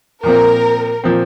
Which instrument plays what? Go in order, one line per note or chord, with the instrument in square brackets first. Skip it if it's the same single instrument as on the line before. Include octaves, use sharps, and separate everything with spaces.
[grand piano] A#2 F3 C4 [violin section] A#4
[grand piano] A#2 F3 C4